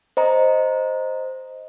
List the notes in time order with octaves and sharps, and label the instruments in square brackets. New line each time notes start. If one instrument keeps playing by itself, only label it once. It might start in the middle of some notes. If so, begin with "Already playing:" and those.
[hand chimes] C5 D#5 A#5